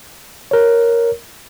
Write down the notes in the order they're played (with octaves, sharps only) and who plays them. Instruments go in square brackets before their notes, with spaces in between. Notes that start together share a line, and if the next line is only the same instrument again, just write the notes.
[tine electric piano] A#4 C#5